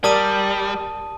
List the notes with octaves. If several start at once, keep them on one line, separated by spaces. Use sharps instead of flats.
G3 G4 A#4 D5 A5 D#6 D#7